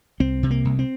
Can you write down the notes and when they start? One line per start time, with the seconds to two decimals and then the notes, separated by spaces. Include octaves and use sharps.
0.20 C2 C4
0.43 C3
0.51 A#3
0.65 C2
0.79 C4